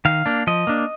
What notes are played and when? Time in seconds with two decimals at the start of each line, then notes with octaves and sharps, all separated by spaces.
0.05 D#3 F5
0.26 A#3 D4
0.47 F3 D#5
0.67 A#3 D4